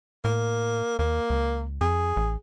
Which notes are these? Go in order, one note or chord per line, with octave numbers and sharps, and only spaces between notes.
A2 A#3
D#2 A#3
C#2
F2 G#4
A1